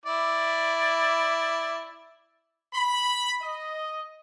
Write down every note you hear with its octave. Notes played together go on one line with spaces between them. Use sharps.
E4 D5
B5
D#5